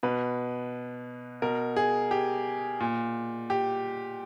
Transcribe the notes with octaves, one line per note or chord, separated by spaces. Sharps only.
B2 B4
B2 A#4
G#4
G4
A#2
G4